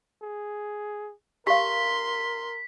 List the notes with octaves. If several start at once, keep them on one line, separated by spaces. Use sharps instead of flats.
G#4
G4 A#4 F5 C6 B6